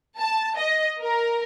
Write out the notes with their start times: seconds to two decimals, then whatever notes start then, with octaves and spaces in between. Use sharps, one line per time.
0.18 A5
0.57 D#5
1.02 A#4